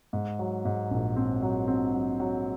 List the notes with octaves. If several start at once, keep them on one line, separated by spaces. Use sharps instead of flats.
G#2
F#3
G#2
A#1
C4
F#3
C4
F#3
F#3